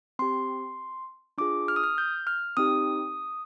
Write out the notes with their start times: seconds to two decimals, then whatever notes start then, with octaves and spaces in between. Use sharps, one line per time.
0.19 C4 G4 C6
1.38 D4 F4 G#4 D6
1.68 F6
1.76 D#6
1.84 F6
1.98 G6
2.27 F6
2.57 C4 D#4 G4 D#6